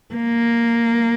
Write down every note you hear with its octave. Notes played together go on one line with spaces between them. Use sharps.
A#3